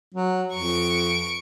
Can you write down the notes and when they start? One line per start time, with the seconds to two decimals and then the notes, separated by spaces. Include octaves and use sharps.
0.15 F#3
0.54 F2 C#6 D7